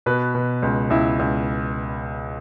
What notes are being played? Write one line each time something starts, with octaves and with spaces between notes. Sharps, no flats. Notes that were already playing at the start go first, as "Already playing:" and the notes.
B2 B4
B2
C#2
C#2 E4
C#2